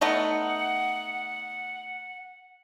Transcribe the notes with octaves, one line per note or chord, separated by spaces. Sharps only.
A3 B3 D#4 F#5